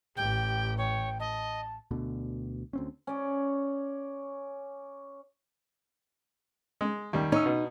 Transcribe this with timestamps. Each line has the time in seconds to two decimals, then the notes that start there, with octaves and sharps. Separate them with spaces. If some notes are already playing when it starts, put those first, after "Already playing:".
0.17 A1 G4 G5
0.78 C#5 G5
1.20 D#5 A5
1.91 D2 B2 D3
2.73 D2 C4 C#4
3.07 C#4 D5
6.81 G#3
7.13 D#2 G3
7.32 C#4 D#4 E6
7.46 B2